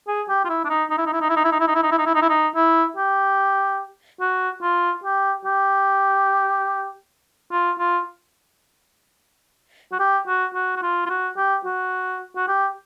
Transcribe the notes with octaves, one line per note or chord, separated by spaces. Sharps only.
G#4
G4
F4
E4
D4
D#4
D#4
E4
D#4
E4
D#4
E4
D#4
E4
D#4
E4
D#4
E4
D#4
E4
D#4
E4
D#4
E4
D#4
E4
G4
F#4
F4
G4
G4
F4
F4
F#4
G4
F#4
F#4
F#4
F4
F4
F#4
G4
F#4
F#4
G4